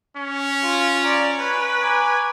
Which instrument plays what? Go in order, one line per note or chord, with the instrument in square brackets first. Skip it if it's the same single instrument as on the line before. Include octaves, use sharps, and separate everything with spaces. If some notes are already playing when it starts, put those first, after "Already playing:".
[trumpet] C#4
[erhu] F4
[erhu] D5 [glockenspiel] A#5 D7
[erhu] B4 [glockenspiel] G#5 C#6 G#6
[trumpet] G#5 [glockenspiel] A#5 D6 D7